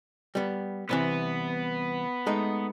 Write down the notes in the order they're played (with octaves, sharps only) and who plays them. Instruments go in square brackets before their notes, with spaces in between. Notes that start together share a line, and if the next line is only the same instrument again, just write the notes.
[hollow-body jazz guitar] G3 B3
[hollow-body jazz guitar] C2 C3 E3 [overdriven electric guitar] B3
[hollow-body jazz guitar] G#3 A3 D#4